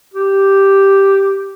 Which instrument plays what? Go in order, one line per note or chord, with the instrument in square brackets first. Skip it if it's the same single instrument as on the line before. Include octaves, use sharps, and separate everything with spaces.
[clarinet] G4